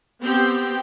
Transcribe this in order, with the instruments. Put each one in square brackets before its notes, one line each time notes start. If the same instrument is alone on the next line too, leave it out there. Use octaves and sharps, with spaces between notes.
[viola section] B3 C4 G4 G5